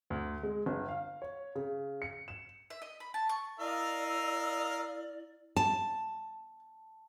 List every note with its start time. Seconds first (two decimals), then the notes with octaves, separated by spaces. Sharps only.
0.10 D2
0.43 G#3
0.66 G1
0.89 F5
1.22 C#5
1.55 C#3
2.02 C#7
2.28 E7
2.70 E5
2.82 D#5
3.00 B5
3.14 A5
3.29 C#6
3.59 E4 A#4 D5 D#5 F5 E6
5.56 A5